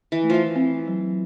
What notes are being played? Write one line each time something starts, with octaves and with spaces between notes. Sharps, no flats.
E3
A3
E3 F3
C4
F#3